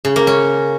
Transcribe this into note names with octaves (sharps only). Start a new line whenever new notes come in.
C#3
A#3
C#4